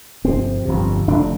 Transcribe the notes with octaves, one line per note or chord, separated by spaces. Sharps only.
G1 F2 C3 C4
G1 F2 C3
F1 F2 D3 D4